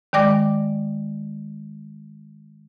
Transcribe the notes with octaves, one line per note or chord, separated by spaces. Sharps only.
D#3 G#3 D5 G5 D6 A#6